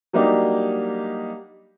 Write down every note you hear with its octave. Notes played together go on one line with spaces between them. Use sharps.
F#3 G3 A#3 D4 D#4 G4